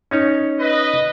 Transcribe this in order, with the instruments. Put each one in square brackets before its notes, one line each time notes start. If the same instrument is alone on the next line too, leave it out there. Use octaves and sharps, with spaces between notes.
[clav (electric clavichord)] C#4 D#4 C#5
[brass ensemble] B4 D#5